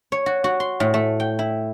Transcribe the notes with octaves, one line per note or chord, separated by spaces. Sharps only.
C#5
F#4
F#4
C6
A2
A3
G5
E4